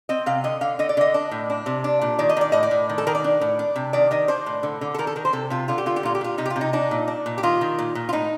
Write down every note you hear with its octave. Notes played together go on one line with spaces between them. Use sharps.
C4 D#5
C3 F5
D3 D#5
D3 F5
D3 D#5
D5
D3 D#5
D4
A2
D4
C3
D4
A#2
D#3 D5
D#5
D#3 D5
A2 D#5
D5
A2
D#3
A4
D#3 A#4
D5
D4
A2
D4
C3
D#3 D5
D#3 D#5
D4 C5
A2
D3
D3
A4
D#3 A#4
A4
D#3 A#4
C5
C3 A4
C3 F4
D3 F4
G4
D3 F4
G4
A#2 F4
G4
A#2 F4
C3 D#4
G4
F4
C3
D#4
D4 D#4
A#2
D4
A#2
G4
D#3 F4
D#3
A#2
A#2
F4
A2 D#4